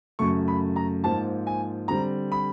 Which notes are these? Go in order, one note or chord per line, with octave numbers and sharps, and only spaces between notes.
F#2 C#3 F#3 A3 C#6
B5
A#5
G#2 F3 A#3 A5
G#5
D3 G3 C4 A#5
B5